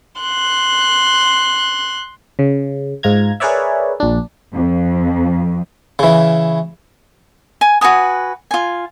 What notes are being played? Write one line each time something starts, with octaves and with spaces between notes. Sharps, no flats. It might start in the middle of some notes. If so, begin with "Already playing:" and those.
C6 F#6
C#3
G#2 F4 A#5 G#6
G#4 A#4 B4 C#5 D5 E5
A#1 D4
F2
C#3 E3
G#5
F#4 B4 G#5 D#6
F4 G#5